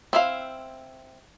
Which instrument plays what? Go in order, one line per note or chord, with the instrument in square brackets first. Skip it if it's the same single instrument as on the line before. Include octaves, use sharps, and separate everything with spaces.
[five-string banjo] C4 E4 F5